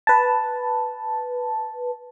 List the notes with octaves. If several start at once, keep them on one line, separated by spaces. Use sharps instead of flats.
B4 A5